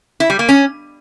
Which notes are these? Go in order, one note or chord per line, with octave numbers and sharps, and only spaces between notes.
E4
G3
A#3
C#4